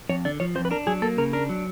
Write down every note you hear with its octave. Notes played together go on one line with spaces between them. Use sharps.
F2 C#5
D3 D5
F3 C#5
F2 C5
B4
D4 A#4
F#3 G#4
A#3 A4
C#3 A#4
D4 A#4
F#3